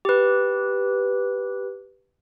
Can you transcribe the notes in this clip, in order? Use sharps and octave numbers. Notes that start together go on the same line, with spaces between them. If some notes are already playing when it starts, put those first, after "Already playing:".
G4 B4